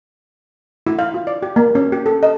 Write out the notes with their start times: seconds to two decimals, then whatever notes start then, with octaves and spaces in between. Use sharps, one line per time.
0.87 E4
0.99 F5
1.14 F4
1.27 D5
1.43 G4
1.56 A#3
1.75 C#4
1.92 G4
2.06 A4
2.23 D#5